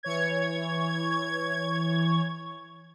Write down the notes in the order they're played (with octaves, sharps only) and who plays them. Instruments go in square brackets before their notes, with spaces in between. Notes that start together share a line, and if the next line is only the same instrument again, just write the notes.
[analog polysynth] E3 C#5 G#6